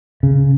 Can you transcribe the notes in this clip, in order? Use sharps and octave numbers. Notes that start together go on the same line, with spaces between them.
C#3